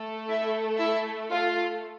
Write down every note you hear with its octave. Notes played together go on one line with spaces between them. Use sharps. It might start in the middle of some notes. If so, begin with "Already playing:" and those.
Already playing: A3 A4
E4 E5
E4 E5
F4 F5